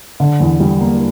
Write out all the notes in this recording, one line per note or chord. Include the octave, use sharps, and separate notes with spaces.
D3
E2
G3
A#3